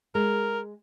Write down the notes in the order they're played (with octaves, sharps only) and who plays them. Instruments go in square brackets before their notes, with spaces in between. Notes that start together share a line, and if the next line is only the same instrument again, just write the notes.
[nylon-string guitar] G#3 [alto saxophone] A#4